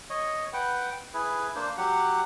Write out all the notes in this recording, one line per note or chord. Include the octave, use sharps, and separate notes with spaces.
C#5 D#5
B4 F#5 G5
E4 G#4 B4
A#3 D4 C5
F#3 G4 F#5